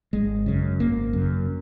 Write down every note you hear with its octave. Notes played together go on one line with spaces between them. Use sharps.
G#1 G#3
F#2 C#3
G#1 A#3
F#2 C#3